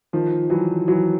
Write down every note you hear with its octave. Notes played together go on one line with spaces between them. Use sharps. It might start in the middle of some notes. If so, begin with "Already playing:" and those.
D#3 F3
E3 F#3
E3 F#3